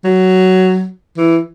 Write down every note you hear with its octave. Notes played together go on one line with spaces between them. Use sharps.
F#3
E3